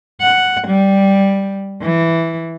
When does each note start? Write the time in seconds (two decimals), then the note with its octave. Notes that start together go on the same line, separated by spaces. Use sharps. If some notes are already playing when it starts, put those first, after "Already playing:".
0.21 F#5
0.67 G3
1.82 E3